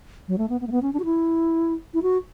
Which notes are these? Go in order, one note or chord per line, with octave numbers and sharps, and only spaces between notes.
F#3
A3
B3
B3
A3
B3
C#4
D4
F#4
E4
E4
F#4